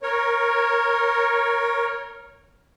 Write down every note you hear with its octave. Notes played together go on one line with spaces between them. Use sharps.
A#4 C#5